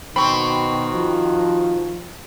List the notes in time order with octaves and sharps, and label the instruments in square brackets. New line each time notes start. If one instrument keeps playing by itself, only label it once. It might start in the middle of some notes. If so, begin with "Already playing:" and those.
[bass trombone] B2 [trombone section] D#3 F#4 [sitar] C4 [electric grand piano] B5 C#6
[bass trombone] F3